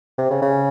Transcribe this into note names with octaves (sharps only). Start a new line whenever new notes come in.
C3
C#3
C#3